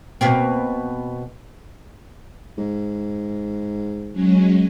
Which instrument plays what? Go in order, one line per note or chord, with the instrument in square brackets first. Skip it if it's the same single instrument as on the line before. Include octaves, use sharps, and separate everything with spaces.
[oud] B2 A#3 C4
[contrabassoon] G#2
[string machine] F#3 G#3 C#4